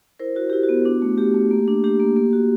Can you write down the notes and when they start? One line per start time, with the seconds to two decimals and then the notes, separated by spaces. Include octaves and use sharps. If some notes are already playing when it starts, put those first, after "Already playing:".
0.19 E4 A#4 C5
0.36 E4 F#4
0.50 E4 G4
0.63 F#4
0.69 B3
0.85 D4
1.02 A3
1.18 A3 G4
1.34 A3
1.51 A#3
1.68 D4
1.84 D4 G4
2.00 A#3
2.17 A#3
2.33 F#4